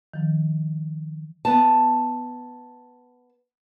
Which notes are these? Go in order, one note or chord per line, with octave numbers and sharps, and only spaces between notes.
D#3 F3
B3 A5